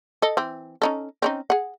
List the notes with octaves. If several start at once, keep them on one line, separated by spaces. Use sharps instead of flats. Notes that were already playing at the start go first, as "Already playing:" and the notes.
A4 D#5
E3 C4
C#4 D#4 A4
C4 C#4 D#4
G#4 F#5